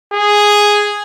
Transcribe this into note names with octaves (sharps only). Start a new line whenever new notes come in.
G#4